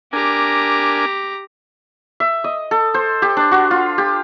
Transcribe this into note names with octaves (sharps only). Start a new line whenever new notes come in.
D4 G4 A#4 G#5 A#5
E5
D#5
A4
C5
G4
D4
F#4
F4
G4